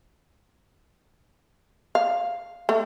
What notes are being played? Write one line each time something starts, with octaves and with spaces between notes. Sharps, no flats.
F5
A3